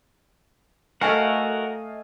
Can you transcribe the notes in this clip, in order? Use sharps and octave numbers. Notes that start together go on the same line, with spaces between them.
A3 F#4 A#4 D#5 F5 F#5 G#5 C#6